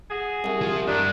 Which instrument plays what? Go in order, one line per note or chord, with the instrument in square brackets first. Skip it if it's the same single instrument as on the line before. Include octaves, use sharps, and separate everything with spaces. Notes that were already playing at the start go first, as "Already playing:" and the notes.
[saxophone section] F#4 G#4
[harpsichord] C2
[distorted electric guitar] F3
[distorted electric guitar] G2 G3 [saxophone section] D#3 D4